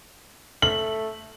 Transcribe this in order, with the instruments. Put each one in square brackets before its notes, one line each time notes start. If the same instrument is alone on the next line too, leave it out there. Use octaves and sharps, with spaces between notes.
[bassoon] A3 [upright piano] F#7